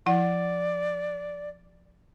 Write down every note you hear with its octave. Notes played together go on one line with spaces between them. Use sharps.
F3 E4 D5 F#5